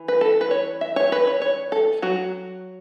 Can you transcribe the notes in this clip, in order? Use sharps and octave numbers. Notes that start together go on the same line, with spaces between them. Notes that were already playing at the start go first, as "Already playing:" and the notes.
Already playing: E3
B4
A4
B4
C#5
E5
C#5
B4
C#5
C#5
A4
F#3 F#4